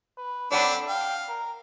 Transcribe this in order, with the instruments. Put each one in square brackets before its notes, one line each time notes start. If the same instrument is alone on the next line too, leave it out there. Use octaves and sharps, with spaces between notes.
[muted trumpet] B4
[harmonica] C4 D4 [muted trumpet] A4 [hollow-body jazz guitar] C#5 F#5 B5
[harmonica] F5 [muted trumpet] G5
[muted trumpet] A#4